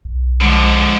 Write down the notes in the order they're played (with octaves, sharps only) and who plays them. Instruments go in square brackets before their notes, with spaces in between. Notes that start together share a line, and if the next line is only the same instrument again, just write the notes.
[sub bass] B1
[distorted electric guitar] D3 F3 [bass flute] G#3